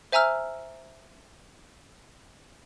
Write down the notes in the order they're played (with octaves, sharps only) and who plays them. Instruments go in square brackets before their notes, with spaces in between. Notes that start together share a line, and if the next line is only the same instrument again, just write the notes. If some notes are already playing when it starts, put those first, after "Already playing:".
[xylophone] C5 E5 G#5 A#5 E6 F6